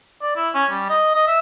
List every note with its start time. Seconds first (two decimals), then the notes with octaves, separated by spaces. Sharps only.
0.22 D5
0.36 E4
0.54 C#4
0.71 G3
0.90 D#5
1.14 D#5
1.27 E5